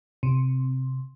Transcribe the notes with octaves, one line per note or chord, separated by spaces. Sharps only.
C3